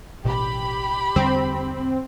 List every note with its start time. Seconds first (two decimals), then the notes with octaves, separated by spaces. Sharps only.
0.25 A1 B2 G4 B5
1.16 E2 D3 G3 C4